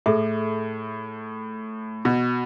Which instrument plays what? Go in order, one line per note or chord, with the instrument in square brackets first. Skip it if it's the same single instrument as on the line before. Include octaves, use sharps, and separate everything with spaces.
[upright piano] A2 [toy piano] G#4 A4 E5
[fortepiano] B2